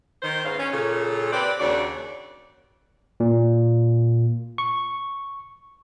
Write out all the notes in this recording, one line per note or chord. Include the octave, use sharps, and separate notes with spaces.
D#3 C5
G#2 B3 C#4 F5
C#4
A#2 C#3 A4
C4 G4 B4 C5 D5
D#2 C#3 D4 F#4 C#5 D5
A#2
C#6